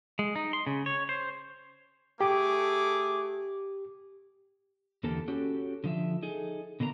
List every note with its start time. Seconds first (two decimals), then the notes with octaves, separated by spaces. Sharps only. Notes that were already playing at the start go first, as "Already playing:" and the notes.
0.19 G#3
0.36 D#4
0.53 C6
0.67 C#3
0.86 C#5
1.09 C5
2.21 A3 G4 G#4 D6
5.03 E2 D3 A#3 G4 A4 A5
5.28 C#4 F#4 G4 A4
5.84 D3 F3 E5
6.23 D#4 G#4 A4
6.80 B2 D3 A#3 E4 A#5